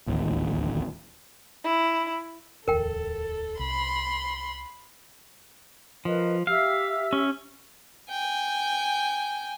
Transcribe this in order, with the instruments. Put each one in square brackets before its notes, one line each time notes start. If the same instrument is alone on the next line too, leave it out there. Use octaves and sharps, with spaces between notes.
[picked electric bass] D1 A1 D#2
[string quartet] E4
[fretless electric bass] D1 E2 [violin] A4 [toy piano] A#4 G5
[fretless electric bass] C2 [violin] B5 C6
[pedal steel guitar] F3 [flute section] A#4 B4 D#5
[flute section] G4 E5 E6 [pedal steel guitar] F5
[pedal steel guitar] C#4
[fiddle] G5 [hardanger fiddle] G#5